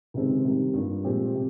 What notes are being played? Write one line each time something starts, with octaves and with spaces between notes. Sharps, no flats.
C#2 C3 D#3 G#3 C4
C3 D#3 G3
G2 G3 A#3 F4
A#2 F3 G#3 C4 G4
C3